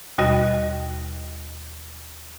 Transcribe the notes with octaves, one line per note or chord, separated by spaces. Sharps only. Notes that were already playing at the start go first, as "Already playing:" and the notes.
D#2 B2 G3 F#4 D#5 A#6